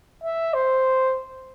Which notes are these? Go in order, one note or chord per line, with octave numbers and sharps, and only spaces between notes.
E5
C5